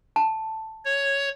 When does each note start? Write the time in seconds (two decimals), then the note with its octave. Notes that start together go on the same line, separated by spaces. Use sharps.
0.16 A5
0.85 C#5